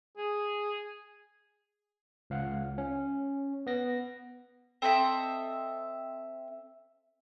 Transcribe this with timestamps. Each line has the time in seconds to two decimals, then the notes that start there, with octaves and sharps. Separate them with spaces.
0.18 G#4
2.30 C#2 F5 F#5
2.78 C#4
3.67 B3 A#6
4.82 C4 A4 D#5 E5